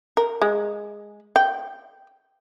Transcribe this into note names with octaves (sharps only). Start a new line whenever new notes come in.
A#4
G#3
G5